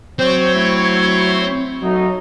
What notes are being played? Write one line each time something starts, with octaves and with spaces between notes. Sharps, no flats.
F#3 C4 C5 C#5
A3 E4
F#3 A3 D#4